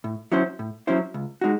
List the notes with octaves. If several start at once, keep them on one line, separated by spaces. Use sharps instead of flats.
A2
F#3 C#4 E4 C5
A2
F#3 C#4 E4 C5
C#2
G#3 D#4 F#4